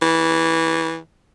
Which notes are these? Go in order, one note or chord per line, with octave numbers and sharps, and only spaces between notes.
E3